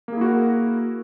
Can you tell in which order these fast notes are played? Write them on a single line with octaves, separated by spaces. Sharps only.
A#3 G#4 E4 F#4 A#4